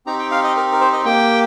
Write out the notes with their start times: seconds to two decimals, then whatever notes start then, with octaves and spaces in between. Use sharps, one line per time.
0.06 C4 D#4 G4 A#5
0.19 G5
0.31 F5
0.44 D#5
0.57 A#4
0.72 A#4
0.81 C5
0.93 D#5
1.05 A#3 G4 G5